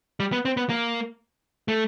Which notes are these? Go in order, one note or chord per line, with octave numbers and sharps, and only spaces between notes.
G3
B3
C4
B3
A#3
A3